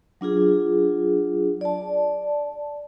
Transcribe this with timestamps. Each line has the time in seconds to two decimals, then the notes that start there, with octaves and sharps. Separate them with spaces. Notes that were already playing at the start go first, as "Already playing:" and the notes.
0.21 F#3 D4 F4 G#4
1.61 D5 A5